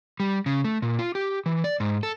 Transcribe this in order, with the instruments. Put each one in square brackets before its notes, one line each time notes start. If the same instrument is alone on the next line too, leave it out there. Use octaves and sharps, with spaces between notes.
[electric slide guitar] G3
C#3
A3
A#2
F4
G4
E3
D5
G#2
A4